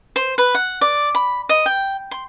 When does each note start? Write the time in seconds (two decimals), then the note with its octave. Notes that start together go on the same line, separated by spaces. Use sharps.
0.16 C5
0.38 B4
0.55 F#5
0.81 D5
1.15 B5
1.49 D#5
1.66 G5
2.11 C6